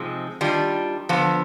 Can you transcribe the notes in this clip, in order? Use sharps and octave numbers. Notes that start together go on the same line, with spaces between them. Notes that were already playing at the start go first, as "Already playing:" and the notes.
Already playing: C3 F3 G#3 C4 D#4
D#3 G3 D4 F4
D3 F3 B3